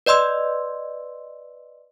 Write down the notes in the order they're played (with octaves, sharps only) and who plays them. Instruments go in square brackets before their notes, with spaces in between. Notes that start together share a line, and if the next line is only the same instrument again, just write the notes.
[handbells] B4 D5 D#5 C6 E6